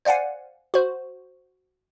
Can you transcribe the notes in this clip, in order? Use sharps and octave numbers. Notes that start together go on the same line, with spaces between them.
C5 D5 F5 F#5 G#5
F#4 C5